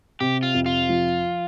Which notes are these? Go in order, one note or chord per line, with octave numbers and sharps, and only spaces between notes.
C3 G4
F4
F2
F4
F3